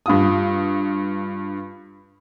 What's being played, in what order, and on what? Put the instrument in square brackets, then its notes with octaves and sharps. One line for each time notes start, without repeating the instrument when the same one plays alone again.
[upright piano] G2 F4 D#6